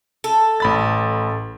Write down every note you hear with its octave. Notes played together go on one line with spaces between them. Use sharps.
A4
A1 B5 A6